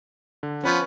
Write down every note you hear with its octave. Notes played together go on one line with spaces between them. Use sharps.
D3
F3 B3 C#4 B4 C#5